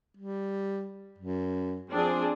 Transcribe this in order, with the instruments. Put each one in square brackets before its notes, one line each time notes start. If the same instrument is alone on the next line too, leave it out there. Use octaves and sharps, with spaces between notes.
[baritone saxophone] G3
F#2
[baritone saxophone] F3 [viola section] C4 D4 G#4